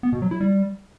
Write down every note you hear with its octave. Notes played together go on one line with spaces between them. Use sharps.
B3
B2
F#3
E4
G3